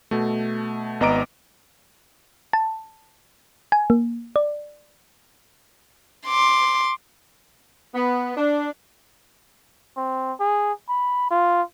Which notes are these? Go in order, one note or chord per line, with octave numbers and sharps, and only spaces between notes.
B2 A3
G#1 B3 D#5 A#5 D6 D7
A5
G#5
A#3
D5
C6 D6
B3
D4
C4
G#4
B5
F4